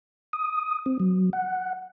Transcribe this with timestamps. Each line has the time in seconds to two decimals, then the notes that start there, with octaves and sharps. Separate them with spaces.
0.33 D#6
0.86 C4
1.00 F#3
1.33 F#5